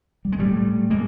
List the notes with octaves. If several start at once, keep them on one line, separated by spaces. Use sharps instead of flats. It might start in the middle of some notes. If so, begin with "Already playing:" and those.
G3
G#3
A2 G3 A3
A2 G#3 A#3